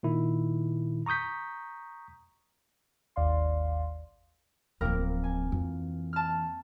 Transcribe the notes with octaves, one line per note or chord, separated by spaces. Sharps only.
A#2 D#3 E4
A#5 C#6 D#6 G6 B6
G#1 D#2 D5 F5 C6
D1 F3 A#3 C4 A#4
G#5
F2 E3
A5 F6